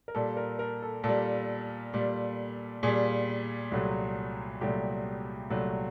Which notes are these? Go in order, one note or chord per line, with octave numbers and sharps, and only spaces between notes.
A#4
A#2 G3 A4
A#4
A#4
A4
A#2 G3 A4
A#2 G3
A#2 G3 G#4
C2 A#2 F#3 A3
C2 A#2 F#3 A3 G4
C2 A#2 F#3 A3